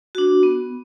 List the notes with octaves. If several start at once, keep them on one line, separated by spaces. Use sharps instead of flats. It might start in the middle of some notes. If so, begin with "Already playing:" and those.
D4 F#4
B3